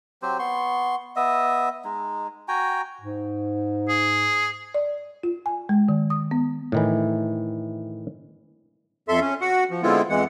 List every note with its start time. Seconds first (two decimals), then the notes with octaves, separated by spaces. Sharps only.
0.22 F#3 C4 G4 C5
0.39 B3 C6 C#6
1.16 B3 D#5 E5
1.85 G#3 D#4
2.48 F#4 G5 G#5 A#5
3.01 G#2
3.89 G#4
4.75 D5
5.23 F4
5.46 G#5
5.69 G#3
5.89 D#3
6.10 D#6
6.31 B3
6.72 A2 D#3 E3
9.09 F2 A4 E5 C6
9.20 C#4
9.41 F#4 F#5
9.71 F3
9.83 D3 G#3 B3 C4 E4 F4
10.09 F2 E3 G#3 F#5